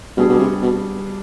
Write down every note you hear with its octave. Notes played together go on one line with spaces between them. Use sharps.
B2 G3 D4 G#4
B2
C3
B2